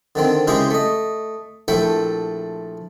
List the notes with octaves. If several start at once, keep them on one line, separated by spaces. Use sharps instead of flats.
D3 D#3 C4
C#3 G#3 E4 G4 G#4 C5
A3 D#5
A#1 A3 E4 A4 G5